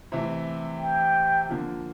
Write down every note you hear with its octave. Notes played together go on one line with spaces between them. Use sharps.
C3 E3 A3
G5
D3 F3 A#3 F4